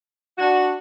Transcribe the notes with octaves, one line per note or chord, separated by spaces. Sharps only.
D4 F#4